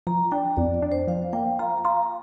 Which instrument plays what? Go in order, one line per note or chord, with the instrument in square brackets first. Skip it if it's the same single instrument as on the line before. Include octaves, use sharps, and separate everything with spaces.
[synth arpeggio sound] F3 [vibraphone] A#5
[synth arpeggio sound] D4 [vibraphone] G5
[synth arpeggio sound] F2 [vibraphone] D5
[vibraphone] D5
[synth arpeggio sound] D4
[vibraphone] C5
[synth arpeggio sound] F3 [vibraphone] F5
[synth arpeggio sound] A#3 [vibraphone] G5
[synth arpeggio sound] F4 [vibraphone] A#5
[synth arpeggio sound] F4 [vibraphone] A#5